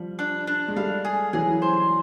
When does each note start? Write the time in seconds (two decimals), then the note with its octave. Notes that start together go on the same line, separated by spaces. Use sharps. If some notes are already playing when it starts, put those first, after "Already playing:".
Already playing: F3 G3
0.19 D4
0.47 D4
0.68 G#3
0.76 G3 A3 F5
1.05 G#4
1.33 E3 F#3 G#4
1.62 C5